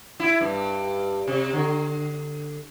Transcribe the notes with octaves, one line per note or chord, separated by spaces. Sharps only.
E4
G2
C3
D3